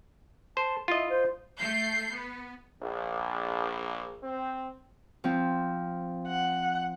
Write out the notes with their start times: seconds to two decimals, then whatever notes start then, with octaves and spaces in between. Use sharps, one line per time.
0.57 C5 A5
0.88 E4 F4 D#5
1.09 C5
1.59 A3 G6 C7
2.13 B3
2.82 A#1
4.22 C4
5.24 F3 C4
6.27 F#5